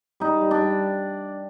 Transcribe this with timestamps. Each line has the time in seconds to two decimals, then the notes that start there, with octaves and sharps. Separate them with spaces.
0.20 G3 D#4
0.41 G3
0.51 D4
0.61 G3